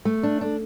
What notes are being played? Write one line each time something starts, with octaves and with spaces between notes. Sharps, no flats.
A3
D4
D4